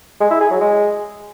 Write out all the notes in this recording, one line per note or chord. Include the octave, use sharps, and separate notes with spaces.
G#3
E4
G#4
F#3
G#3